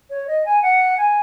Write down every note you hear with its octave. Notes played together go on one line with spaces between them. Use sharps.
C#5
D#5
G#5
F#5
G#5